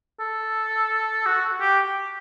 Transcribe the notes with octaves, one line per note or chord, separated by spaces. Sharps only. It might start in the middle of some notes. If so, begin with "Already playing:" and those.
A4
F#4
G4